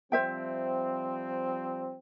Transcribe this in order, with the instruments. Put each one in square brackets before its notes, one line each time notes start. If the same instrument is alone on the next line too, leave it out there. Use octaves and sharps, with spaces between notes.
[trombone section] F3 G3 C4 [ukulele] C5 E5 G5